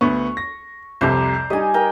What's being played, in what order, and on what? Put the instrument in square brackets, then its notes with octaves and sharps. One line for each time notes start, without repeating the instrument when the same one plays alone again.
[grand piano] D2 B3 [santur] C#6
[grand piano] A#6
[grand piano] C2 F2 C3 [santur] C5 D5 A#5
[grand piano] G3 D#4 [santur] D#5 G#5
[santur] A#4 G5